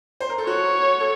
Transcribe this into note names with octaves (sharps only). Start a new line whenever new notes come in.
C5
A#4
A4
F#4 C#5
A4